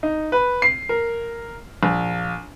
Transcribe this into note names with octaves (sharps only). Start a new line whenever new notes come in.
D#4
B4
C7
A#4
A#1